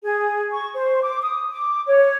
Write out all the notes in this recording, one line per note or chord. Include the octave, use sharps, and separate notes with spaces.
G#4
C#6
C5
D6
D#6
D6
C#5